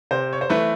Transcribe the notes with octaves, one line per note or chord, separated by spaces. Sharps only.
C3 C5
C#5
C5
E3 A3 B4